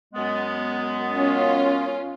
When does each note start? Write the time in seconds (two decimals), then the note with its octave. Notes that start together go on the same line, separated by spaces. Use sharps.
0.14 F#2 G#3 B3
1.12 C#4 F4